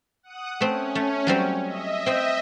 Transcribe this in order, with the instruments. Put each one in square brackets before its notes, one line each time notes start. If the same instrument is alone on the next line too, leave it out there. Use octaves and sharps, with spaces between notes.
[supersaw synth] F#5 D#6 F#6
[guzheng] A3 C4 [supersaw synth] C#4
[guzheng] A3
F#3 G3 C4
[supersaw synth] D#5 E5
[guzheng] C4 G5